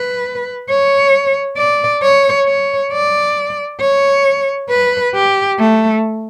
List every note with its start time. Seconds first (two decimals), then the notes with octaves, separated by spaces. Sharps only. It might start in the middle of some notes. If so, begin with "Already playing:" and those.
Already playing: B4
0.69 C#5
1.57 D5
2.02 C#5
2.46 C#5
2.92 D5
3.80 C#5
4.70 B4
5.14 G4
5.59 A3